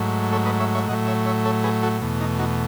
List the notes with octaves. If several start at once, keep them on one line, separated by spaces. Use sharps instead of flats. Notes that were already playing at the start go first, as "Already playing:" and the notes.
Already playing: G#2 F#3 A3
A4 C#5
B4 D#5
C#5 E5
C#5 E5
A2 F#3 A3 D#5 F#5
C#5 E5
C#5 E5
A4 C#5
G#4 B4
F#4 A4
E2 B2 A3
D#4
D#4 F#4